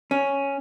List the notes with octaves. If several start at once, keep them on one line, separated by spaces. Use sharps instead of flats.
C#4